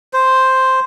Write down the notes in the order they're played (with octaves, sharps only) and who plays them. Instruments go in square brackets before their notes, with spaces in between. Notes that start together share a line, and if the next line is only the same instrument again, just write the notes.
[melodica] C5